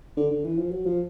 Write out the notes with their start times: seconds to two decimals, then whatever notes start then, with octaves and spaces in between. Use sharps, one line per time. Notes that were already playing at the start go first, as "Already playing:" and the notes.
0.17 D3
0.31 D3
0.44 E3
0.58 F3
0.71 F#3
0.86 F3